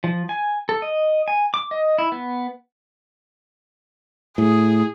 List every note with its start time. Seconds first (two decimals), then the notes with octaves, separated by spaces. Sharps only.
0.04 F3
0.29 G#5
0.69 A4
0.82 D#5
1.28 G#5
1.54 D6
1.71 D#5
1.98 E4
2.12 B3
4.38 A2 G#4